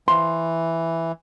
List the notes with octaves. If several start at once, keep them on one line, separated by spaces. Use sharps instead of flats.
E3 C6